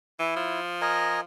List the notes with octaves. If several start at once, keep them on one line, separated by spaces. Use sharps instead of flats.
E3 E4
F3
A#4 D#5 G#5